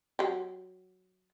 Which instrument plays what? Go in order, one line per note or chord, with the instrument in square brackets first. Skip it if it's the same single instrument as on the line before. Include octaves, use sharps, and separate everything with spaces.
[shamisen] F#3 G4